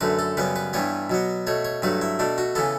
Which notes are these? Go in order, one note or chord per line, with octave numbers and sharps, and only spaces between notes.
F#2 D3 A3 B4
A4
F#2 C#3 G3 B3 B4
B4
G2 E3 G3 B3 C#5
B2 F#3 B3
B2 A3 C#5
C#5
G2 F#3 A3 B4
E4
B2 A3 D4
F#4
C#3 E3 B3 A4